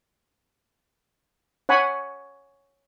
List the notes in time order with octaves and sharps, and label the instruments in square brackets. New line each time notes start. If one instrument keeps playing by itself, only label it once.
[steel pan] C#5 F#5 G#5 B5